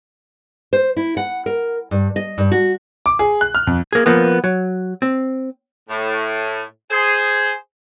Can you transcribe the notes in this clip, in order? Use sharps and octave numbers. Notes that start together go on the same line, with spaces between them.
C5
E4
F#5
A#4
G2
D#5
G2
F#4
D6
G#4
F#6
F6
F2
A#3 G#4
F3 A#3 B3
F#3
C4
A2
G#4 C5